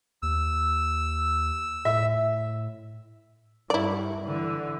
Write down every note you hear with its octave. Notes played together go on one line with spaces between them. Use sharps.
D#2 E6
A2 E5
G2 E4 D5
D3 E3